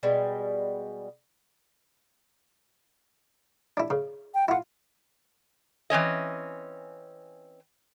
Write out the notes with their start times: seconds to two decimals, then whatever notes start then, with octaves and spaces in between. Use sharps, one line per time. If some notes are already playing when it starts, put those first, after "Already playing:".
0.03 B2 G3 G#3
3.77 D4 E4
3.90 C#3
4.34 G5
4.48 E4 F4 F#5
5.90 E3 C4 C#4 D#5